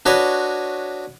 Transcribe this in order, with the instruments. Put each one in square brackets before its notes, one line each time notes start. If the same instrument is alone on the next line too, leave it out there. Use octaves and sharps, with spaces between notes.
[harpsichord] D4 F#4 B4 C#5 D#5